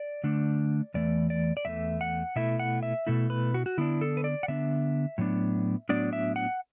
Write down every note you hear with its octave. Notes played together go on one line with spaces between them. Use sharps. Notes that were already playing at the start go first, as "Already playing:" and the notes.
Already playing: D5
D3 A3 D4
E2 E3 A3 D5
D5
D5
E2 E3 A3 E5
F#5
B2 A3 E4 E5
F#5
E5
B2 A3 E4
B4
F#4
F#4
D3 B3 D4 E4
A4
B4
D5
F#5
D3 B3 D4 E5
A2 F#3 B3 D4
A2 F#3 B3 D4 D5
E5
F#5